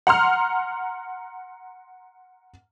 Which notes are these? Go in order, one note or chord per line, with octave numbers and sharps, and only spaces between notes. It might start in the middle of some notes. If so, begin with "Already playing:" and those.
F#5 A#5 C6 F6